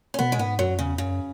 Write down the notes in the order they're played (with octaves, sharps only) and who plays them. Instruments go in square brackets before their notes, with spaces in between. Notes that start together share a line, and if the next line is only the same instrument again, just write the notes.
[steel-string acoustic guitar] C#4
[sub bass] B2 [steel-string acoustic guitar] B3
[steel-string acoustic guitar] G#3
[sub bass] G#2 [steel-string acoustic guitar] B3
[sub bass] F#2 [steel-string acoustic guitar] F#3
[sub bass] E2 [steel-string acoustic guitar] C#3
[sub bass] F#2 [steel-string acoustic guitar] C#3